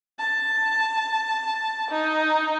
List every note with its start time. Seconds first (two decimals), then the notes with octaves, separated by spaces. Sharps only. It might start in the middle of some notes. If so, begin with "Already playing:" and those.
0.19 A5
1.90 D#4